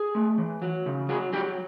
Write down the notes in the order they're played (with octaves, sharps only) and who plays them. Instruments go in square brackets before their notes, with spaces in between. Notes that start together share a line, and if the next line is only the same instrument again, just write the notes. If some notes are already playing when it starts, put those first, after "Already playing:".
Already playing: [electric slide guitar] G#4
A3
E3
F#3
C#3
F#3 G#4
F#3 G4